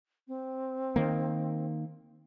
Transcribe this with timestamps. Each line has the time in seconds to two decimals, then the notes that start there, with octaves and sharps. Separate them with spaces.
0.28 C4
0.96 D#3 A#3